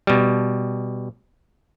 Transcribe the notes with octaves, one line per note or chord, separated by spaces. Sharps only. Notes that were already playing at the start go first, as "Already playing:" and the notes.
B2 G3